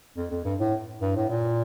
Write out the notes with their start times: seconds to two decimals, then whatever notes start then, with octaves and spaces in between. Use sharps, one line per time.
0.17 F2
0.31 F2
0.45 G2
0.60 A2
1.02 G2
1.16 A2
1.29 A#2